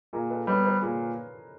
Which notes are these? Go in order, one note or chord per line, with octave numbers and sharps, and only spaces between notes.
A#2 G#4 A#4
A4 B4
G3 B3 B4 C#5
A#4 C5
A#2 G#4 A#4